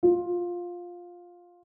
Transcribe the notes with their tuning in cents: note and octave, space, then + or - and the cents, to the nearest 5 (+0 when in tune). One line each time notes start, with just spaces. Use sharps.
F4 +10